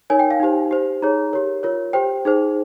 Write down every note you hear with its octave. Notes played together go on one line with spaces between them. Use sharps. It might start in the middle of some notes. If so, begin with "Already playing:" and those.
D#4 A#4 C#5 G#5
G5
F5
D#4 G4 C5
G4 C5
D#4 G#4 C#5 A#5
G4 A#4 C#5
F4 A#4 C#5
G4 C5 G5
D#4 G#4 C5